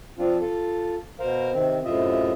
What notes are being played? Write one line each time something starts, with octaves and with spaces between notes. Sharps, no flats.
F3 C4 D4 F4
F4 A4
B2 A#4 C5 F5
C3 D#3 C4
F#2 A2 C3 F4 D#5 E5